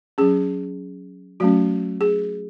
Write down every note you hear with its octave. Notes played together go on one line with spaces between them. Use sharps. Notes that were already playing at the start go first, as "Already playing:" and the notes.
F#3 C#4 G#4
F#3 A3 C#4 F#4
G#4